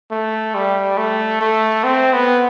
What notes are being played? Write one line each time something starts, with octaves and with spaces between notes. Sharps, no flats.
A3
G3
A3
A3
C4
B3